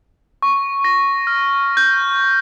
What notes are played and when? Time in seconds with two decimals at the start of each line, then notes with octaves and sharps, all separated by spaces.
0.42 C#6
0.84 A#6
1.27 F6
1.77 G6